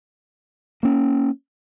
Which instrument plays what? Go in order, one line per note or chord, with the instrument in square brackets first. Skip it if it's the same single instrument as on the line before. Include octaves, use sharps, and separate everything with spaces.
[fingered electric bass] A#3 C#4